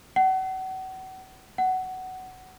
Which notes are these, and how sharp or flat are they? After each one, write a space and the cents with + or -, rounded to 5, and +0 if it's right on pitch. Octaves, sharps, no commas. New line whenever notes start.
F#5 +35
F#5 +15